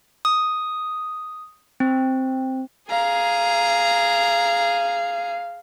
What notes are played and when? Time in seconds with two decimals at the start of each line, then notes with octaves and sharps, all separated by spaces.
0.25 D#6
1.80 C4
2.90 G#4 F5 A#5